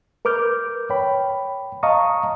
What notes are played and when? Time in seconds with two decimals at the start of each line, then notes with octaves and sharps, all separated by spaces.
0.25 A#4 B4 D6 F6 G6
0.90 C#5 G5 B5
1.83 D#5 F5 A5 A#5 C#6 D#6